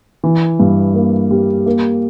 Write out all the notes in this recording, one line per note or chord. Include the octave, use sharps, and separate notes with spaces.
E3
G2
A#3
G3
A#3